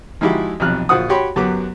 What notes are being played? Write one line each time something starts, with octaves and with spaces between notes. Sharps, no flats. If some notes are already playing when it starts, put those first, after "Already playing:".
F3 G#3 D#4 E4 F#4 G4
B1 F2 C3 F6 F#6
A#1 F4 F#4 C5 F#5 D#6
F#4 G4 C#5 G5 B5 C6
F#2 F#3 B3 G4 D6